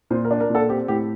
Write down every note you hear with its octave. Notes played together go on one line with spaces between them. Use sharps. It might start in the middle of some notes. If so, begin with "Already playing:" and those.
A#2 C5
A#4
D4
A#4
A#2 A4
C4 G4
A2 G4